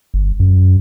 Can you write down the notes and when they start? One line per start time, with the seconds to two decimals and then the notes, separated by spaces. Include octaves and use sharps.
0.14 G1
0.40 F#2